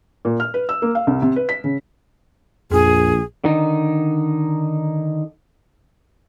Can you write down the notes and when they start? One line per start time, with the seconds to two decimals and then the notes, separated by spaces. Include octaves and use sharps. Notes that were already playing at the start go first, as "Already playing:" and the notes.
0.25 A#2
0.40 F6
0.54 B4
0.69 E6
0.82 A#3
0.95 F5
1.07 C2
1.22 C3
1.36 B4
1.49 B6
1.64 C#3
2.71 A#1 F2 G#4
3.44 D3 D#3 D#4